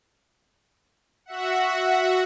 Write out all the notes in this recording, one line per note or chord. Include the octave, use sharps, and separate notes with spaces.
F#4 E5 F#5